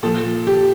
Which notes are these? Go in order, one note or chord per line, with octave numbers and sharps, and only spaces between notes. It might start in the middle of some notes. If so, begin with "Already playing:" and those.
A#2 F3 A4
G4